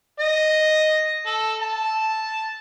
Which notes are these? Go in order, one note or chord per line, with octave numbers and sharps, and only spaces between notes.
D#5
A4
A5